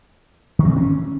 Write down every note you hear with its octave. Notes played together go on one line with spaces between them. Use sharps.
D#3
C4
E3
C#4